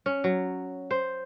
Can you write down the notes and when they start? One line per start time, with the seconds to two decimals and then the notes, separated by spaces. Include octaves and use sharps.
0.06 C#4
0.24 F#3
0.91 C5